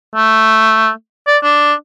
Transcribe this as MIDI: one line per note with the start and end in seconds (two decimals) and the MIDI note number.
0.15 0.90 57
1.27 1.37 74
1.43 1.73 62